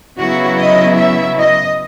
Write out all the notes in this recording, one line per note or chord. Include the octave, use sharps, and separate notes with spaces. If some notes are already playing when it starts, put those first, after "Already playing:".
C#3 F#3 B3 E4 F#4
D#5
E5
D#5